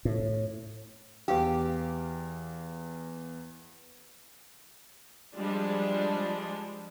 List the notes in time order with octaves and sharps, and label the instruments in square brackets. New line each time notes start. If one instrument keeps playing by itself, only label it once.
[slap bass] A2
[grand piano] E2 F5 [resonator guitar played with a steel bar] G4
[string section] F3 G3 G#3 D4